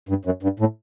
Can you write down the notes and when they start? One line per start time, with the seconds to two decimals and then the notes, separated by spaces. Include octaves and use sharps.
0.09 G2
0.25 F#2
0.43 G2
0.60 A2